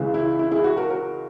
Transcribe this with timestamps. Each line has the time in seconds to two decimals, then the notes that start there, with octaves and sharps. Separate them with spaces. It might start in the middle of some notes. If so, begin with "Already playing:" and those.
Already playing: C#2 C#3 E3
0.14 E4
0.39 E4
0.52 E4 G#4
0.64 F#4
0.77 F#4 A#4
0.90 F#4 A#4